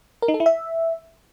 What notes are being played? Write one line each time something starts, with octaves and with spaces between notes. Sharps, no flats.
A#4
D#4
A4
E4
E5